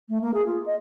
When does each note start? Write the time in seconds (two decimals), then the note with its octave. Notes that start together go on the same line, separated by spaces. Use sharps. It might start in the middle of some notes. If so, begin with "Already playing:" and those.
0.09 A3
0.22 A#3
0.34 G#4
0.47 F4
0.66 D#5